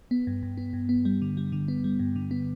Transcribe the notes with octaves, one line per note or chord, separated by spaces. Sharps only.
B3
G2
G2
B3
G2
B3
G3
D3
G3
D3
B3
G3
G2
D3
B3